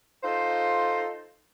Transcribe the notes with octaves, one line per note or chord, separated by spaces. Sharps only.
D#4 F4 A4 C5